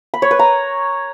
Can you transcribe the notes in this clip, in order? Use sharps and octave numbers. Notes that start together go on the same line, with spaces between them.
B5
C#5
B4
A#5